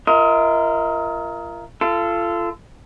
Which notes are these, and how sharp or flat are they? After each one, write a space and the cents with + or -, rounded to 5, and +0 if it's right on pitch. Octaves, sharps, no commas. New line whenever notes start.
F4 -35 A#4 +0 D#5 +35
F4 -30 A4 +0